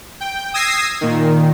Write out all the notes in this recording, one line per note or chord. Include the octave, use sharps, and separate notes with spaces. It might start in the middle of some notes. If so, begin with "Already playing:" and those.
G5
D#6 E6 G#6 A#6 C7
A#2 D#3